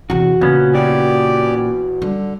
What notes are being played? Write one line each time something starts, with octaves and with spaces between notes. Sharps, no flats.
E2 C3 F#4
A#2 C#3 B3 C#4
E3 F#4 G4 D5
D3 G3